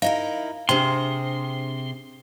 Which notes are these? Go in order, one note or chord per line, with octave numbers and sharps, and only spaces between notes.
D#4 E4 A#4 F5
C3 D4 G#4 C5 G5 C6